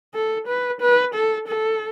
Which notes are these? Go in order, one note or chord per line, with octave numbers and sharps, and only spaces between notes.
A4
B4
B4
A4
A4